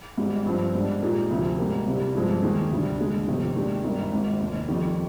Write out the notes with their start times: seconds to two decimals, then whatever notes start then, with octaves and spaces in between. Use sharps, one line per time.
0.17 G#1 G#2 G3
0.46 G2 F3 C4
0.75 G#2 G3 D4
1.03 A#2 G#3 D#4 G4
1.31 D2 C3 F3
1.58 G#2 G3 A#3
1.86 C2 C3 G3
2.15 G2 F3 G#3 C4
2.42 D#2 D#3 G#3
2.71 D2 C3 G3 D4
3.00 D#2 D3 G#3
3.27 G1 F2 C3 D#3
3.56 D#2 D#3 G#3 D4 G4
3.84 G#1 G2 D#3 G3 A#3
4.12 G#1 G#2 D#3
4.40 F1 D#2 D#3
4.68 F2 D#3 G3